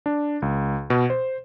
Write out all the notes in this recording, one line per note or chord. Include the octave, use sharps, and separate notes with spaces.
D4
C#2
B2
C5